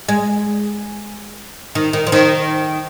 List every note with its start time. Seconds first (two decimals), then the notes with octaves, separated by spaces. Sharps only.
0.08 G#3
1.75 D#3
1.93 D#3
2.07 F3
2.12 D#3